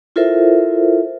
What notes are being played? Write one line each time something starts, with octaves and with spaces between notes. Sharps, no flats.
E4 F4 A4 A#4 C5 E5